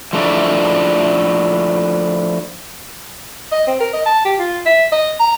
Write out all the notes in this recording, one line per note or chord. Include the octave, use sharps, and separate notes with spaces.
F3 A3 D4 E4
D#5
C4
A#4
D#5
A5
G4
F4
E5
D#5
A#5